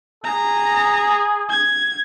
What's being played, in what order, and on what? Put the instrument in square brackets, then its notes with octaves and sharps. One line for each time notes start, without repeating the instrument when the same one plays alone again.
[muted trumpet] G#4 [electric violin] A#5
[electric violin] G#6